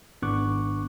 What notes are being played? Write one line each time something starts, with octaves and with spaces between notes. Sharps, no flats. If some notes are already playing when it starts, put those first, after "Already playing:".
G#1 B3 D4 C#6 D6 F#6